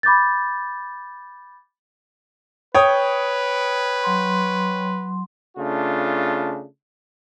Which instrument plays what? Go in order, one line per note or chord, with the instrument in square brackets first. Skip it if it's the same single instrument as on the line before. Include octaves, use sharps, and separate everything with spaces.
[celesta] B5 D6 G6 A6
[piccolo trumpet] B4 [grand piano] C#5 G5 D#6
[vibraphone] F#3 C6
[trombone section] C#3 A3 D4 F4